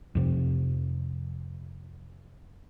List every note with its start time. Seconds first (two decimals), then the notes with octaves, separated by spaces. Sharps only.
0.15 F2 C3